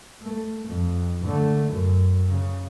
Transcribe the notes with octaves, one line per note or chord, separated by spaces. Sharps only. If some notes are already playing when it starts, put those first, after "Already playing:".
A3
F2
D3 A3
F#2
C#3